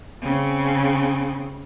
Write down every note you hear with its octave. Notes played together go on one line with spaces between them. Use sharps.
C#3 C4